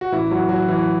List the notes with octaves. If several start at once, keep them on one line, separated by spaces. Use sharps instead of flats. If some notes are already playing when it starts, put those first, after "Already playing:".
F#4
A1 E3 E4
F#3 F#4
F#3 F#4
E3 E4